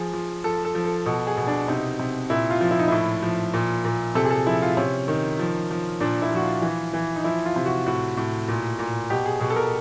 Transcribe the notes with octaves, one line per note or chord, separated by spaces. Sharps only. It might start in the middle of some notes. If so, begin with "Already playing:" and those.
Already playing: F3 G#4
F3
F3 A4
A4
F3
A4
B2 A4
G#4
B2
D4
C3 D#4
C3
A#2 E4
F4
F3
E4
D#4
A2 E4
F3
A#2
A#2
C3 A4
G#4
A4
F3 E4
F4
C3 C#4
D#3
F3
F3
A#2 D4
E4
F3 F#4
F4
E3
E3
D#4
F3 E4
F4
C3
F#4
A2 F#4
A2
A#2
A#2
B2 G4
G#4
B2 G#4
A4
A#4